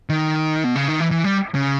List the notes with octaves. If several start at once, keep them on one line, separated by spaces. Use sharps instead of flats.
D#3
B2
C#3
D#3
E3
E3
G3
C#3